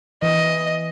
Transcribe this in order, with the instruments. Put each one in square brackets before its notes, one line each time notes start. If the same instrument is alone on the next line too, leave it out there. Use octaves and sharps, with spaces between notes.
[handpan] E3 [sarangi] D#5